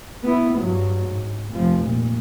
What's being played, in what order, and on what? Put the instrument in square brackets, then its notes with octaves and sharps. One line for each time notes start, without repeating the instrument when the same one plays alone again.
[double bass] B3 E4
G2 F#3
G#2
F1 F3
A#2